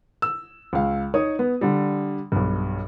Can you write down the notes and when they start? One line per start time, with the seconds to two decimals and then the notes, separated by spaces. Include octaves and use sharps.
0.22 E6
0.73 C#2 F5
1.14 D#4 C#5 D#6
1.39 B3
1.61 D3 G3
2.32 B1 G2